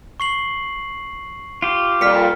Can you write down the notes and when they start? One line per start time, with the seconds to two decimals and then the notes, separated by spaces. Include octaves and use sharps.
0.20 C#6 C7 F#7
1.62 F4 G4
2.01 F2 A#2 G3 F6 B6 C#7